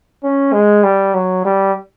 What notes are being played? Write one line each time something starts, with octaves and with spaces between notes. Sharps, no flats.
C#4
G#3
G3
F#3
G3